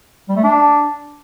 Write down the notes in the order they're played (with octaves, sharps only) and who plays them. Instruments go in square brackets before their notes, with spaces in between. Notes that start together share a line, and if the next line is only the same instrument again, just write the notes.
[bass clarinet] G3
A3
D4